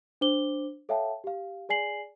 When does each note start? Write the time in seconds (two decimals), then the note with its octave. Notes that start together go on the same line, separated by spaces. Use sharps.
0.21 D4 C5 D6 G7
0.89 A4 C#5 E5 F5 G5 A5
1.24 G4 F5
1.69 G#4 D5 G#5 C7 F#7